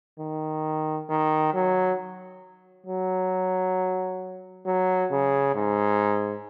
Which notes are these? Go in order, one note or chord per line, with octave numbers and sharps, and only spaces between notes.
D#3
D#3
F#3
F#3
F#3
C#3
G#2